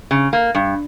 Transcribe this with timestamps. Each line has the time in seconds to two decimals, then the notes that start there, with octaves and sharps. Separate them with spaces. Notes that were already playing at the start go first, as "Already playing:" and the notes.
0.11 C#3
0.33 A#3
0.55 G2